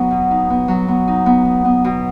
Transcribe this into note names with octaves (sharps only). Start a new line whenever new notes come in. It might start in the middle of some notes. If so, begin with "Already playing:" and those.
Already playing: F#3 B3 D#4
B2
D#4
B3
F#3
B3
D#4
B3
D#4
B3
B2